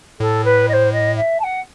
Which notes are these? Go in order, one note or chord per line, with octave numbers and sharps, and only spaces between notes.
A2 A4
B4
D#5
C5
D#5
E5
A5
F#5